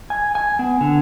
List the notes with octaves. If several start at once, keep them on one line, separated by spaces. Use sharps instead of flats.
G#5
G#5
B3
D3